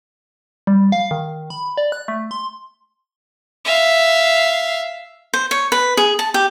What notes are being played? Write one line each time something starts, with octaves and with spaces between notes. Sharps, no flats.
G3
F5
D#3
B5
D5
F#6
A3
C6
E5 F5
C5
C#5
B4
G#4
A5
G4